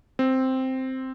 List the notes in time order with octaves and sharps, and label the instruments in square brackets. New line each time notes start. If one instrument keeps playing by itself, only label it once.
[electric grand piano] C4